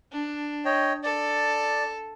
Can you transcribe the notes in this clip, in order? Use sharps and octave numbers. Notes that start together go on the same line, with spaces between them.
D4
C#5 D#5 G5
A4 D5